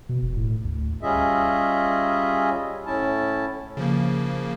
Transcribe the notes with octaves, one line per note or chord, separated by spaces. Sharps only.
B2
F1
A2
D2
G3 C#4 F4 G#4 D#5 E5
A2 C#4 E4 A5
C#3 F3 A#3